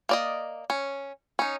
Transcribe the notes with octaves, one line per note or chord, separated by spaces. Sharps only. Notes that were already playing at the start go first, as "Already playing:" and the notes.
A#3 D5 D#5
C#4
C#4 D#4